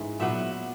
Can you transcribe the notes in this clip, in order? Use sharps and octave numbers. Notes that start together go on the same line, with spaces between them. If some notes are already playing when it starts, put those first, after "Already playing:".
Already playing: G#2 E3 C#4
A#2 F#3 B3 E5